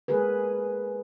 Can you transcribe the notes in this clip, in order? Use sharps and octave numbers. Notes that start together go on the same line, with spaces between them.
G#3 A#3 G#4 A#4 B4